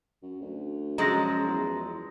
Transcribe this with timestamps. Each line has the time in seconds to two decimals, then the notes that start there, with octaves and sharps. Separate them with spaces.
0.22 F#2
0.41 D2
0.98 F#2 F3 F#3 G#3 A#5 A#6
1.47 E2